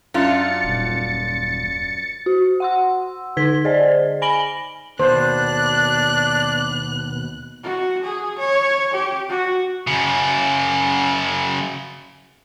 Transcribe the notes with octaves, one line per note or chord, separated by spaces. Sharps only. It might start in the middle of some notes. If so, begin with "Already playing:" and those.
F#2 D4 F4 A6 C#7
D#1
F#4
F#5 C6 E6
D3 D#4 G#6 B6 G7
G#4 C5 D5 D#5
G#5 B5 A#6 D7 F#7 G7
D#2 B2 D4 C5 F#6
F#4
G#4
C#5
G4
F#4
F#2 C#3